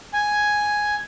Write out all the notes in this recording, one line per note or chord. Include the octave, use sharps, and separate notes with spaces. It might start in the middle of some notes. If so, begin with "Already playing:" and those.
G#5